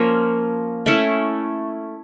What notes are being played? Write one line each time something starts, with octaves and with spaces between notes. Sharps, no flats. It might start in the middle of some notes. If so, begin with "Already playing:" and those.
Already playing: F3 A#3 C#4
A3 C#4 E4